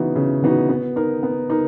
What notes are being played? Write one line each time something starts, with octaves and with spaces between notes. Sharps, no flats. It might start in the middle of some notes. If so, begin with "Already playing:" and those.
Already playing: C#3 E3 B3 D#4 F#4
C#3
E3 B3 D#4 F#4
B3
D#4 A#4
B3
D#4 A#4